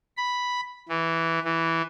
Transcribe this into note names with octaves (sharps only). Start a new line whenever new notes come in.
B5
E3
E3